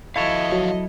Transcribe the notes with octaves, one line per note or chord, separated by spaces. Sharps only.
F3 E4 F#4 A4 C#5 D#5 F5
F#3